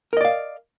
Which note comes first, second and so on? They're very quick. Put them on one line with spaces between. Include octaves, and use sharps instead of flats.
A#4 D#5 D5 F5